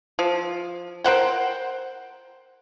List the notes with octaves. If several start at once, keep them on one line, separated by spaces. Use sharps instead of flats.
F3
A#4 C5 F#5 G5